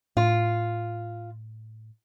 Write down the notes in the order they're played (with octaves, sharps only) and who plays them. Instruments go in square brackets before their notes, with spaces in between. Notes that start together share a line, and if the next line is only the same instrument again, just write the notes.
[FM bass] A2 [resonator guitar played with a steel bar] F4